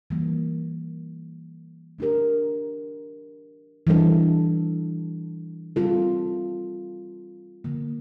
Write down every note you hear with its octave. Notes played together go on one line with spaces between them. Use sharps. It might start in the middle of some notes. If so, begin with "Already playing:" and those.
E3 G3 A#3
A3 D4 G4 A#4
E3 G3 D4 A4
G3 C4 F4 A4
D3 F3 A#3